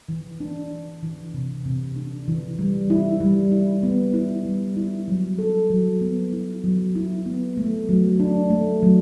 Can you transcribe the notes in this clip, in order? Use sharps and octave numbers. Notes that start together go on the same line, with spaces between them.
E3
D4
D4
E3
C3
C3
D4
E3
G3
E4
G3
E4
B3
E4
G3
E4
F#3
A4
F#3
B3
E4
F#3
E4
B3
A3
F#3
D4
A3
F#3